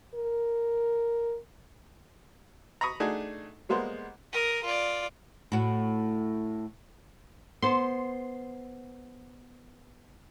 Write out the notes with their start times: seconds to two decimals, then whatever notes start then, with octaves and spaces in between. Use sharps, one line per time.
0.15 A#4
2.81 A#5 B5 C#6 D#6
3.00 A3 D4 D#4 F#4 G#4
3.69 G3 G#3 A#3 B3 C5
4.33 A#4 D#6
4.63 F4 D5
5.52 A2 F#4
7.62 B3 C5 C6